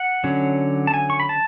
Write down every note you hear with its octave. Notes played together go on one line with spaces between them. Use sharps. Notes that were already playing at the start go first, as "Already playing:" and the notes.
Already playing: F#5
D3 F#3 C#4
A5
G#5
C#6
B5
A5